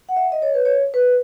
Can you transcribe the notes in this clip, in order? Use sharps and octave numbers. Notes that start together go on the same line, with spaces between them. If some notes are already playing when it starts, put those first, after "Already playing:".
F#5
E5
D#5
C#5
B4
C#5
B4